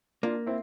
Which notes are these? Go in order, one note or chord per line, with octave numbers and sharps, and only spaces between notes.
A#3 D4 F4
C4 E4